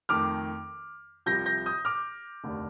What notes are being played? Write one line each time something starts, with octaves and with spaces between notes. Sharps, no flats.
F2 D#3 A3 D6 F6
C2 C3 F3 G6 A#6
G6 A#6
D#6 G6
D6 F6
F1 D#2 D3 A3